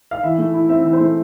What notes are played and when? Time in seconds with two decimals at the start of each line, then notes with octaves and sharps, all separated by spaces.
0.11 F5
0.23 E3 E5
0.38 A3
0.54 E4
0.69 C4 E5
0.85 E3
0.93 C5
1.00 A3